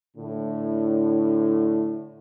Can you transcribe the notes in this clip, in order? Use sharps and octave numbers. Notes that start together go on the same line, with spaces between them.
A2 D3